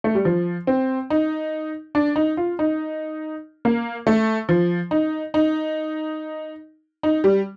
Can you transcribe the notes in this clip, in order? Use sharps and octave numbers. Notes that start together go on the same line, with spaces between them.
A3
G3
F3
C4
D#4
D4
D#4
F4
D#4
A#3
A3
F3
D#4
D#4
D#4
G3